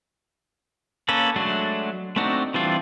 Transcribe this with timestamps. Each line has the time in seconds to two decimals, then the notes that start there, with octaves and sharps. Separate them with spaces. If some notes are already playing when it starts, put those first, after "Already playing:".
1.09 A#3 C#4 A4 B4
1.36 F#3 G#3 A3 D4 F#4
2.16 A3 C4 D4 D#4 F#4
2.54 E3 G3 C4 D4 F4